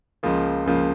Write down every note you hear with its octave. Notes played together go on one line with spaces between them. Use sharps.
C#2 C#3 F3 A#3
C#2 C#3 F3 A#3